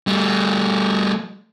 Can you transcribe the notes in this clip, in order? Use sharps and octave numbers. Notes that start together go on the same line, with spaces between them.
G3 A3